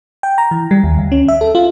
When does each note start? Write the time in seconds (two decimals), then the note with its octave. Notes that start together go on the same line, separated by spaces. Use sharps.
0.23 G5
0.38 A#5
0.51 E3
0.71 G3
0.84 D#2
0.98 D2
1.12 C#4
1.28 E5
1.41 A4
1.55 F4